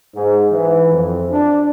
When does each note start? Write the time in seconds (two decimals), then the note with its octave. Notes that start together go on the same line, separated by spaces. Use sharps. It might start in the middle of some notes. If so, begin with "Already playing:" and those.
0.15 G#2
0.52 E3
0.93 F2
1.31 D4